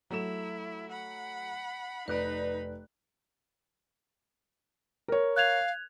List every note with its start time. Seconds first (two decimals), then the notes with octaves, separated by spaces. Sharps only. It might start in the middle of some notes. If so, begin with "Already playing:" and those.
0.10 F#3 A3 E4 E7
0.91 F#5 B5
2.08 F1 D#4 B4 D5 B5 F#6
5.08 A#4 C#5
5.36 F5 F#6 G#6 F7